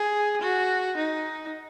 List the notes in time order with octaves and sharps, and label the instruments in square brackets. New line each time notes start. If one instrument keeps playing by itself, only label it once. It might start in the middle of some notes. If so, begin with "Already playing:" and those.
Already playing: [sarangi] G#4
F#4
D#4